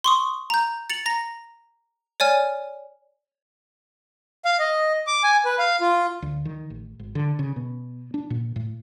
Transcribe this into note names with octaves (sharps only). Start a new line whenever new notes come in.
C6 C#6 D#6
A#5 G6
A6 C#7 F7 F#7
A#5 A#6
C#5 D5 G#5 F6
F5
D#5
D6
G#5
B4
F5
F4
D2
D#3
A1
G#1
D3
C#3
B2
D4
A#2
A2